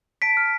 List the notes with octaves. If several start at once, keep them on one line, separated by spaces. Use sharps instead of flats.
A5 B6 D7
F6